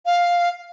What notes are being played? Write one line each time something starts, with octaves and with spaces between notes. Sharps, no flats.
F5